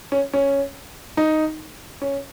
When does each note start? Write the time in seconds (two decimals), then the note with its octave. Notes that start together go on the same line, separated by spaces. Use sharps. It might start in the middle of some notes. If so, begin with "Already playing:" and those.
0.12 C#4
0.33 C#4
1.17 D#4
2.02 C#4